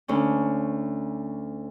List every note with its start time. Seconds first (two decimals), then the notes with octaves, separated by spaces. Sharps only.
0.08 D2 C#4